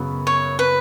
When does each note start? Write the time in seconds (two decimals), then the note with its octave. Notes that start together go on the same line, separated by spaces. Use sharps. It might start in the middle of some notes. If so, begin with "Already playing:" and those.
Already playing: F#2 C#3 B3
0.27 C#5
0.59 B4